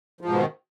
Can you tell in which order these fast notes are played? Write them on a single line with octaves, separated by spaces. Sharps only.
F3 G#2 B2 D#3